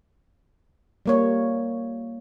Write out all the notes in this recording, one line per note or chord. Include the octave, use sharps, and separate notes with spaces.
G3 A#3 C#5